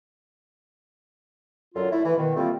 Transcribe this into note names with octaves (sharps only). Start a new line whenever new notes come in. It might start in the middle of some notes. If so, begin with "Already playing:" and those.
F#2 D3 F#3 F4
A3 E4
E3
B2 D#3
G3 A3 A#3 C4 F4